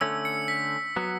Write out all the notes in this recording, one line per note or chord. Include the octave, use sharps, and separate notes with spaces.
D3 A3 C#4 E6
C#7
B6
F#3 B3